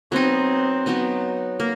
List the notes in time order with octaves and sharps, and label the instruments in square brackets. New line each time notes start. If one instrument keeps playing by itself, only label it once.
[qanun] F#3 B3 D#4 [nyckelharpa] C4
[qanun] F#3 B3 D#4
A#3